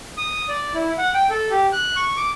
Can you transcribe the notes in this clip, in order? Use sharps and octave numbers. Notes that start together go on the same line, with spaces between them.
D#6
D5
E4
F#5
G5
A4
G4
F#6
C#6
D6